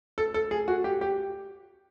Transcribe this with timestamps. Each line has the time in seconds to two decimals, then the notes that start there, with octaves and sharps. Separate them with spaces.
0.18 A4
0.34 A4
0.51 G#4
0.68 F#4
0.84 G4
1.01 G4